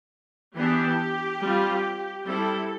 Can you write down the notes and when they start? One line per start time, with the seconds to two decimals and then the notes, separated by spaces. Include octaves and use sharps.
0.56 E3 B3 D4 G4
1.41 G3 C4 F4
2.25 G3 C4 E4 A4